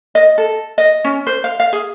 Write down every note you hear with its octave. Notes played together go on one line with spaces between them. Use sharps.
D#5
A4
D#5
C#4
C5
F5
F5
G#4